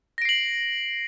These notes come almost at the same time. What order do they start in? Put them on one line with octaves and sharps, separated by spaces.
A#6 D7 C7 F#7